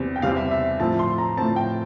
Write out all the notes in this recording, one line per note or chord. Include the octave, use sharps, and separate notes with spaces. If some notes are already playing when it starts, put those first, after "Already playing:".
Already playing: E2 C3 G3 C4
G5
E2 C3 G3 C4 F5
E5
E5
A2 F3 C4 A5
C6
A#5
A2 F3 C4 A5
G5